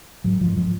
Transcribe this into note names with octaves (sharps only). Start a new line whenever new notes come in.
G#2 F#3
G#2 F3
F3